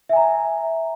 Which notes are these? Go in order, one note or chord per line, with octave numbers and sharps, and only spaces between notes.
E5 G#5 A#5